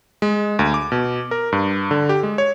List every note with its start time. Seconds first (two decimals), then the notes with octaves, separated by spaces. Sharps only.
0.22 G#3
0.59 D2
0.74 D6
0.92 B2
1.31 A#4
1.52 G2
1.91 D3
2.09 G4
2.23 G#3
2.38 C#5